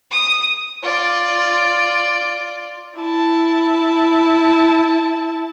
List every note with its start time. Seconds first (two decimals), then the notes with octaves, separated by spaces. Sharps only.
0.11 D#6
0.83 F4 D5
2.98 E4 A5